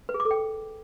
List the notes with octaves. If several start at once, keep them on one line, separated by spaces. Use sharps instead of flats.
B4
G#4
D6
A4
G5